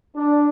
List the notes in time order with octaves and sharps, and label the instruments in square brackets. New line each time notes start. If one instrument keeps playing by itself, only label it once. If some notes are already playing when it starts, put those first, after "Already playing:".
[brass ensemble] D4